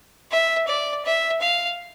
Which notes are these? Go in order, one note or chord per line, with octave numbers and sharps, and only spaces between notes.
E5
D5
E5
F5